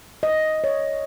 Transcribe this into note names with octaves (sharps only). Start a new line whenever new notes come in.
D#5
C#5